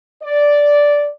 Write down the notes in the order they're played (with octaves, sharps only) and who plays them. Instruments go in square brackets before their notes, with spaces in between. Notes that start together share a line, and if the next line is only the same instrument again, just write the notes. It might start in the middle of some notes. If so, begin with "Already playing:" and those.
[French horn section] D5